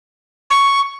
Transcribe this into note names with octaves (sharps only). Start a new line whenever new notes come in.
C#6